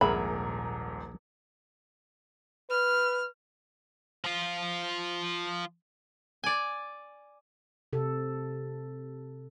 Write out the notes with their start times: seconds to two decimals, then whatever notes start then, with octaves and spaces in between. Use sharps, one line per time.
0.01 D#1 A#1 G#2 G#4 A#4 E5 F#5 B5
2.70 B4 F6
4.24 F3 F4
6.44 D5 G#5
7.93 C3 A4